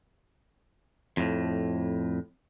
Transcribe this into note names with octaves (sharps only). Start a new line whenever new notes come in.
F2 A2